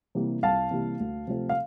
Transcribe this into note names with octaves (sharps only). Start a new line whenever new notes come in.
C3 E3 G3 A#3
C2 F5 A5
C3 E3 G3 A#3
D2
C3 F3 A3 C4
F5